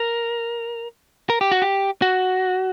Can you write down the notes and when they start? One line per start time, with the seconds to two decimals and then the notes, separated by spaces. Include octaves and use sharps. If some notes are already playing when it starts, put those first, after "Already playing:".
Already playing: A#4
1.30 A#4
1.41 G4
1.52 F#4
1.62 G4
2.02 F#4